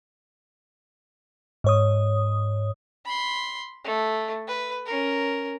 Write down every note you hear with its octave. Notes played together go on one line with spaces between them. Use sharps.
G#2 C#5 D#6
B5 C6
A3
B4
C#4 A#4